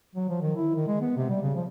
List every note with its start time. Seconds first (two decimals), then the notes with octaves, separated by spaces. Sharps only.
0.15 F#3
0.29 F3
0.42 D#3
0.57 E4
0.75 D#3
0.87 G#3
1.01 B3
1.16 C3
1.30 G3
1.42 C#3
1.55 F3